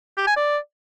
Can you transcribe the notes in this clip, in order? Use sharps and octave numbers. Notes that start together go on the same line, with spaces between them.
G4
G#5
D5